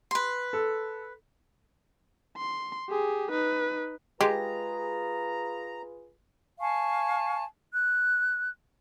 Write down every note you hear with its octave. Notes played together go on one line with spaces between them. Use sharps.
B4 C6
A4
C6
G4 G#4
D#4 B4
G#3 F4 G4 G#4 B4 A#5
F5 G#5 A5 C#6
F#6